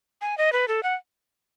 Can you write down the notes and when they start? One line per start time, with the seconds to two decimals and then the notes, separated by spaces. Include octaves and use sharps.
0.21 G#5
0.38 D#5
0.53 B4
0.68 A4
0.83 F#5